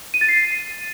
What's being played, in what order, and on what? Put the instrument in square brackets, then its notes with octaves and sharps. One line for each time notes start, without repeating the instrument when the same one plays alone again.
[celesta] D#7
A6
C7